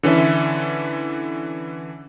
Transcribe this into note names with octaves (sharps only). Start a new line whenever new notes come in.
D3 E3 C#4 A4 E5